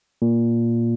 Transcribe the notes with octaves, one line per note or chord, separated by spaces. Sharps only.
A#2